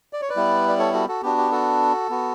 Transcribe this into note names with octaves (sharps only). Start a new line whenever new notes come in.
D5
C#5
B4 D5
G3 B3 E4
D5
A4 C#5
F#4 A4
F#4 A4
B3 D4 F#4 G4
G4
F#4 A4
B3 F#4